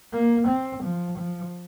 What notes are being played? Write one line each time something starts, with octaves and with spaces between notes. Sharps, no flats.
A#3
C4
F3
F3